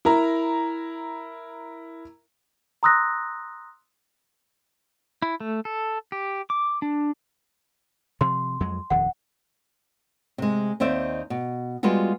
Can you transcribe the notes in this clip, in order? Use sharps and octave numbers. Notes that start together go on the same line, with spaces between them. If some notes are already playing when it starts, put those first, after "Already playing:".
E4 A#4 A#5
A#5 C6 D#6 E6 F#6 A#6
E4
A3
A4
G4
D6
D4
C3 F3 C6
F2 F#3 G#3
D#1 F2 D#3 F#5
C3 G#3
D#2 C4 D#4 D5 E5
B2
G3 G#3 B3 F4 F#4